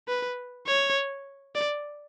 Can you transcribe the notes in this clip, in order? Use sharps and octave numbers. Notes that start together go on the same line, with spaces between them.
B4
C#5
D5